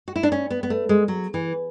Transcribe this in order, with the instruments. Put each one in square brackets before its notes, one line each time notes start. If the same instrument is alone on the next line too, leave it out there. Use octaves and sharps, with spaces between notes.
[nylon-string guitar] F#4
E4
D4
C#4
B3
B3
A3
G#3
F#3
E3